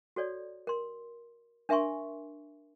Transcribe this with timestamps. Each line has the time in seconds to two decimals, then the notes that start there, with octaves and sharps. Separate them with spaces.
0.16 F#4 A4 C#5 D5
0.67 A#4 C6
1.69 D4 A#4 E5 G#5 C6 C#6